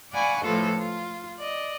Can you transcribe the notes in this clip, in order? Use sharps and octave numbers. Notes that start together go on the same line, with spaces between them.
D5 F5 F#5 G#5 B5 C#6
A2 E3 F3 F4 A4
F4
D5 D#5